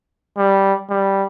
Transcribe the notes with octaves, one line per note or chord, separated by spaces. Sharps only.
G3
G3